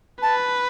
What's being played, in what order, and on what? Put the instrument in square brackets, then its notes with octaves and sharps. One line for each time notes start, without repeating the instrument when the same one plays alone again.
[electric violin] B4 [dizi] A5